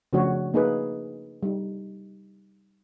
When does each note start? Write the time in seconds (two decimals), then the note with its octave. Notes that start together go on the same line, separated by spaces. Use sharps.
0.13 C#3 F3 A3 D4 F#4 C#5
0.54 A#3 D#4 G#4 B4
1.43 G3 D#4